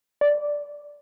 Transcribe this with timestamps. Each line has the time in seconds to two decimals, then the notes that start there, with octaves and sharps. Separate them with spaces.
0.21 D5